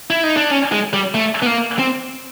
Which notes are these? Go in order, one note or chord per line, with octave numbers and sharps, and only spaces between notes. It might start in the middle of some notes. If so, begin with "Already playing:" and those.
E4
D#4
D4
C#4
G#3
G3
A3
B3
A#3
C4